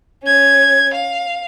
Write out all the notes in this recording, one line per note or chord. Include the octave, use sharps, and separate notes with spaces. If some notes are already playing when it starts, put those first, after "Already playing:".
C#4 G#6
F5